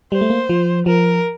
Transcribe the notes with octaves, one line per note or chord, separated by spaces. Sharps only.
G3 C5
A3
A#3
F3
F3 A#4